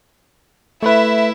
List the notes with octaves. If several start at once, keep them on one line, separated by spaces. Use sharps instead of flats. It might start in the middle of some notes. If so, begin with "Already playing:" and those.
A3 E4 B4 E5